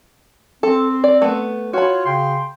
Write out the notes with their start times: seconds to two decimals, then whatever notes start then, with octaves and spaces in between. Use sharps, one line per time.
0.63 C4 A4
1.04 D5
1.22 A3 B3
1.73 F4 F#4 C#5 B5
2.06 C#3 G5 C6